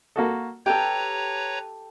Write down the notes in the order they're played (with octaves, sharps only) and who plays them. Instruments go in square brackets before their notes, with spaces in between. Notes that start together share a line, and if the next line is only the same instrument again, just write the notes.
[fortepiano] A#3 F#4 A4
[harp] G4 A4 [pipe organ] B4 C#5 A#5 [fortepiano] G5